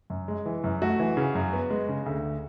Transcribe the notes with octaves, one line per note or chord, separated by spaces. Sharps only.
F#2
G#3
E3
F#2
A3 F#4
E3
C#3
F#2
B3
G#3
C#3
D2